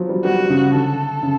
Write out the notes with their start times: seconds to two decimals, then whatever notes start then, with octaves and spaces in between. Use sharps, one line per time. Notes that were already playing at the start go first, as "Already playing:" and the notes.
Already playing: F3 F#3
0.09 G3
0.25 G3 F#4
0.50 C#3
0.73 D3 A4
1.23 C#3